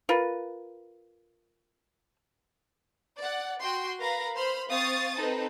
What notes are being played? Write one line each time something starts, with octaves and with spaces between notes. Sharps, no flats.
F4 A#4 B4
D5 F#5
F#4 G5 C6
A#4 B4 F5 A#5 B5 A#6
C5 B5 C6 F6
C4 F5 C#6 D#6 A6
C4 D#4 A4 B4